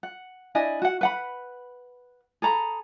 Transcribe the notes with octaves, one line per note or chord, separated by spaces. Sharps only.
F#5
D4 E4 D#5 G#5
F#4 F#5
B4 F#5 B5
G#4 A4 A#5 B5